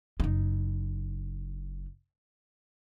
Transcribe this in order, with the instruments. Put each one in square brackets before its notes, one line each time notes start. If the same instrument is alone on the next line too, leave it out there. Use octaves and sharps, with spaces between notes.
[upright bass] F#1 D#4